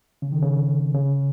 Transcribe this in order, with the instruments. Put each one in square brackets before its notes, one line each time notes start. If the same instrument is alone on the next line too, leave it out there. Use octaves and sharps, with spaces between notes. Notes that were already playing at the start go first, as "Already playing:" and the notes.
[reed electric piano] C#3
D#3
C#3
C#3